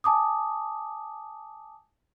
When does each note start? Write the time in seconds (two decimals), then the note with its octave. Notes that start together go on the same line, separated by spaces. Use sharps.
0.04 G#5 A5 D6 D#6